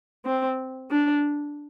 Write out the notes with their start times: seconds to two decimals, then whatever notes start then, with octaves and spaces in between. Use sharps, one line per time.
0.25 C4
0.91 D4